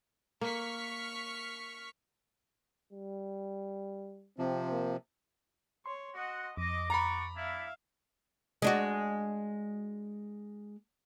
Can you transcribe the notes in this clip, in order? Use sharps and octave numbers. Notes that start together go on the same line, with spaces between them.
A#3 C#6 F6 B6
G3
C3 F3 C4
A#3
C#5 C6
F#4 D#5 F#5
F2 D#5 D6
F#4 D5 A#5 B5 C#6
D4 E4 E5 F5
G#3 D4 F#4